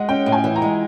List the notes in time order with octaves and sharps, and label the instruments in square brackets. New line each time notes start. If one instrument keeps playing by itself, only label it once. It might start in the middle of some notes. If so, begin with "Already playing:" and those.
Already playing: [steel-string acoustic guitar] G#3 [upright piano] D#5 F#5
[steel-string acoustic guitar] C#4 [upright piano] G5
[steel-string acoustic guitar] A2
[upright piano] G#5
[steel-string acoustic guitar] E3
[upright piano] A#5
[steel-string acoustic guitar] G#3